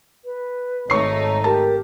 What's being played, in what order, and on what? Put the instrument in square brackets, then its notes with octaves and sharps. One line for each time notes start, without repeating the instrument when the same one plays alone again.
[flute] B4
[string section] G#1 A3 D#4 [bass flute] C#5 [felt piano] C#6 C7
[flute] G4 [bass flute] A#4 [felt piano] A5